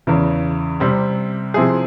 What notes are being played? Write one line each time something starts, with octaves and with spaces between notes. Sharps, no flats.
E2 C#3 E3
C3 G3 C4
C3 F3 C4 E4 G#4